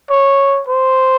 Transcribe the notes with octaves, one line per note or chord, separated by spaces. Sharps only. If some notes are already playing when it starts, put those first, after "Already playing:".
C#5
C5